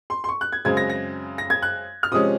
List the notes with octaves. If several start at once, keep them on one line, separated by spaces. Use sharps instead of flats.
C6
C6
C#6
F#6
G#6
F#2 C#3 G#3 C4 G#6
A#6
A#6
A#6
G#6
F#6
F6
C3 F3 G#3 C#4 D#6